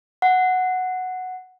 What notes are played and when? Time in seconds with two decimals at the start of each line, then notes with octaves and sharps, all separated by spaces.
0.22 F#5